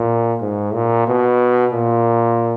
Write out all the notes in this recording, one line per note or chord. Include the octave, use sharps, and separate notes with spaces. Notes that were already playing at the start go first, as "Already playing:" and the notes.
Already playing: A#2
G#2
A#2
B2
A#2